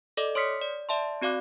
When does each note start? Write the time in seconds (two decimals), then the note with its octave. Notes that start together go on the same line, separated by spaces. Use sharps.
0.17 A4 D5 D#5 D6
0.35 C#5 C6 D#6 F6 B6 C#7
0.61 D5
0.89 D5 E5 A5 C6
1.21 C4 F#4 D5 F5 D6 F#6